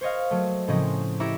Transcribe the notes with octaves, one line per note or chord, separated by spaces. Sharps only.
C5 C#5 D#5 F5
F#3 A3
A2 C#3 F3 C4 C#4 D#5
E4 G4 C#5 E5 A#5 D6